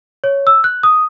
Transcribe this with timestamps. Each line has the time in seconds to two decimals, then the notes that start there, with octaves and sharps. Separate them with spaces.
0.24 C#5
0.47 E6
0.64 F#6
0.83 D#6